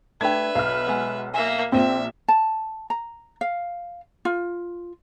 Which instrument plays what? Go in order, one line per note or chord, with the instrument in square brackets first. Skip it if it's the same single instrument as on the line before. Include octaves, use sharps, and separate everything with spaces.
[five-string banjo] A3 G4 [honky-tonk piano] D4 G#6 [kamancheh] B4 E5
[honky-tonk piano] B1 F6 [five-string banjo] F5
[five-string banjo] G#3 B3 F#5
[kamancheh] A#3 E5 [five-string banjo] F5 G#5
[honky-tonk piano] A#1 A#2 [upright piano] C4 [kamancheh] E5
[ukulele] A5
A#5
F5
F4